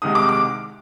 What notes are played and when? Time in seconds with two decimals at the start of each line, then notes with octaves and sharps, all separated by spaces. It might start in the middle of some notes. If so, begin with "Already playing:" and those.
0.02 C2 C3 D#3 G#3 D#6
0.15 D6
0.29 D6